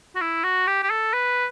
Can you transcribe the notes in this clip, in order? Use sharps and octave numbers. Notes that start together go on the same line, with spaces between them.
F#4
E4
F#4
G4
G4
A4
B4